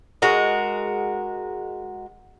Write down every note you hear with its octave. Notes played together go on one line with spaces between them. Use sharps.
G#3 F#4 A#4